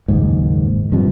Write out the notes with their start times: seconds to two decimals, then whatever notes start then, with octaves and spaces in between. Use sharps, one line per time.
0.08 F#1 D#2 G#2
0.92 G2 C3 F3